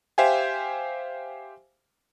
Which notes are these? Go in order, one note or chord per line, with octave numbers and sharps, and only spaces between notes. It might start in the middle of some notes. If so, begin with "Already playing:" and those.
G4 C5 E5 F5 G5 G#5